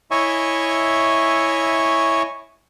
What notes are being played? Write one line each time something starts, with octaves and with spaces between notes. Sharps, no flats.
E4 C#5 D#5 E5 G#5 C#6